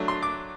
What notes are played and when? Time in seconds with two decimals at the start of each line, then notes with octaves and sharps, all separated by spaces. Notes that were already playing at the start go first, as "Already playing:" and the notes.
Already playing: F#3 A3 D4
0.08 C6
0.23 D6